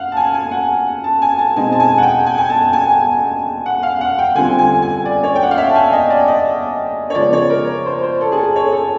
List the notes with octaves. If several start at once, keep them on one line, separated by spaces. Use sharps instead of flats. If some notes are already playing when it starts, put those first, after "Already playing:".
Already playing: F5 F#5
A5
G#5
G#5
F#5
A5
G#5
A5
B2 G#3 C4 D#4 G#5
A5
G#5
F#5
G5
G#5
G#5
A5
G#5
F#5
F5
F#5
G5
D3 G3 C4 F4 G#5
G#5
G#5
D5
C#5
G5
F#5
F5
E5
A5
G#5
D#5
D5
D#5
C#5
C#3 F3 G#3 B3 D5
C#5
A#4
C5
C5
A4
G#4
A4
C#5
A4